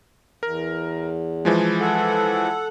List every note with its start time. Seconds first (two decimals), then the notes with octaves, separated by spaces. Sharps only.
0.43 E2 A#4
1.45 E3 F3 G#3
1.80 A4 F#5